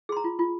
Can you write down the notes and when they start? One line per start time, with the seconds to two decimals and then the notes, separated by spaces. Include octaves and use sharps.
0.09 G#4 C6
0.17 A#5
0.24 F4
0.39 F4